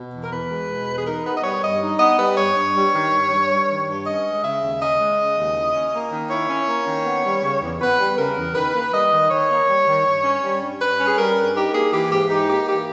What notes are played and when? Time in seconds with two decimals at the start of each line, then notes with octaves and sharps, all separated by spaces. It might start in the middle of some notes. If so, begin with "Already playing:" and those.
Already playing: B2
0.12 E2
0.23 A#4
0.31 E2 B4
0.50 G#3
0.68 B2
0.87 E2
0.96 G#4
1.06 D#4 A#4
1.25 B3 B4
1.37 D#5
1.43 G3 C#5
1.62 G2 D#5
1.81 D#4
1.99 B3 D#5
2.18 G3 B4
2.37 G2 C#5
2.56 G2
2.75 G3
2.94 D#3
3.12 G2
3.31 G2
3.50 G3
3.68 D#3
3.87 G2
4.06 C#4 D#5
4.24 G#3
4.43 C#3 E5
4.62 D#2
4.80 C#4 D#5
4.99 G#3
5.18 C#3
5.37 D#2
5.56 E4
5.74 C#4
5.93 A#3
6.12 D#3
6.30 E4 C#5
6.49 C#4
6.67 A#3
6.86 D#3
7.05 B3
7.24 G3
7.43 C#3
7.61 E2
7.80 B3 B4
7.99 G3
8.17 C#3 A#4
8.37 E2
8.55 D#3 B4
8.74 A#3
8.92 G3 D#5
9.11 D#3
9.30 D#3 C#5
9.49 A#3
9.68 G3
9.86 D#3
10.05 G2
10.23 C#4
10.42 G3
10.61 G2
10.80 G2 B4
10.98 C#4
11.06 G#4
11.17 G3 A#4
11.36 G2
11.55 D#4 G4
11.74 A#3 G#4
11.92 E3 G4
12.11 G#2 G4
12.30 D#4 G4
12.48 A#3 G4
12.67 E3 G4